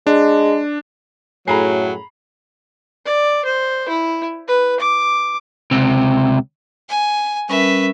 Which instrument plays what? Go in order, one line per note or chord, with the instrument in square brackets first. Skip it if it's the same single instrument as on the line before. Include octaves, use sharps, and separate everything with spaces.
[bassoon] G#3 [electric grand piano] D4
[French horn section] F#2 A2 [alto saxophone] F#3 [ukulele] G#4 [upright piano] A#5 B5 C7
[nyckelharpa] D5
C5
E4
B4
D6
[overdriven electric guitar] C#2 C3
[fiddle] G#5
[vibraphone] G3 C#4 A#4 [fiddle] B4 E5